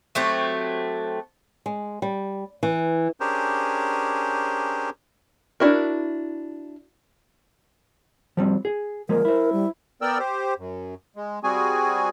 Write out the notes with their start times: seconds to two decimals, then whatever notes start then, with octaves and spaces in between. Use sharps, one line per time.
0.15 F#3 A3 C4 G4
1.66 G#3
2.02 G3
2.63 E3
3.20 C#4 D4 G4 G#4 A#4 C5
5.60 D4 E4 F#4 A#4
8.37 F3 G3 C4
8.65 G#4
9.09 F3 G#3 A#3 A#4
9.25 E4 C5
9.53 G3
10.02 B3 A#4 D5 G5 E6
10.19 G4 C5
10.58 F#2
11.16 G#3
11.44 G3 C4 F#4 G#4 G#5